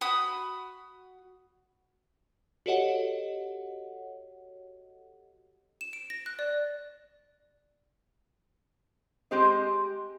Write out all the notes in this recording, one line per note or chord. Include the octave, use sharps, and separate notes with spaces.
F#4 B5 D#6
F#4 G4 A4 C#5 D#5 F#5
E7
D7
A#6
F#6
D5
G#3 C4 G4 C5 D#5